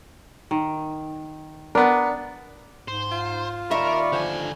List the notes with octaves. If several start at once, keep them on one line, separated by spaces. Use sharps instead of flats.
D#3
B3 D4 A#4
G#2 C5
F4
D#2 D#4 A#4 D5 E5 B5 C#6
D3 F3 G#5